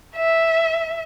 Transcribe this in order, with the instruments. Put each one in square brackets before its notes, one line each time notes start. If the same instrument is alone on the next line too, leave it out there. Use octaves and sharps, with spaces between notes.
[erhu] E5